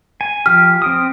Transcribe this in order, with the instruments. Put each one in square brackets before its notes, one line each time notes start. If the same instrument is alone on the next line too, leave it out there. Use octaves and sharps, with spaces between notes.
[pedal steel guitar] G#5
[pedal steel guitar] F3 G4 [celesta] F6
[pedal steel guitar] C4 G5 D#6